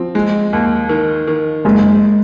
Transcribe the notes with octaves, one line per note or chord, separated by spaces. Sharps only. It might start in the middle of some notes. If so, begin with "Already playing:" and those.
Already playing: F3 C4
G#3
D#2
D#3
D#3
F#1 G#3